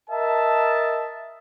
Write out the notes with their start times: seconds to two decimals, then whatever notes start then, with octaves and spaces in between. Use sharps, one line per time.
0.10 A#4 D#5 E5 A5